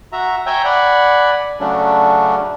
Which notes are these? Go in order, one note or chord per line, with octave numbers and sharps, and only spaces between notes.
F#4 E5 A#5
C#5 E5 G5 G#5 A#5
D5 F#5 G#5 B5
C#3 F#3 A3 C#4 D4